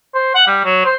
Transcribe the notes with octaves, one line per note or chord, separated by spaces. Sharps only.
C5
F#5
G3
F#3
C5